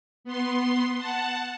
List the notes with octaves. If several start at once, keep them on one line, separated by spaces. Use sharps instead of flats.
B3 C6
F#5 A5